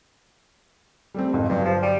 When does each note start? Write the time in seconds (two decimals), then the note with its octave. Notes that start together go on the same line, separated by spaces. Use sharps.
1.14 G3 A3 C4
1.33 G#1 F2
1.49 G1 G2 F#3
1.65 F3
1.82 G3